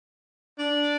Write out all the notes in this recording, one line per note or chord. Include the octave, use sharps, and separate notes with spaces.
D4